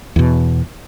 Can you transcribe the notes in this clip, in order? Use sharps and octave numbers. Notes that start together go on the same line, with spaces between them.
E2 B2